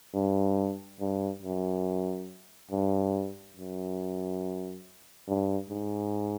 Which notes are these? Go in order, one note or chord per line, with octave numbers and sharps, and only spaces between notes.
G2
G2
F#2
G2
F#2
G2
G#2